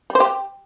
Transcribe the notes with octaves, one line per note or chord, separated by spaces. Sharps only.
G3
C5
G4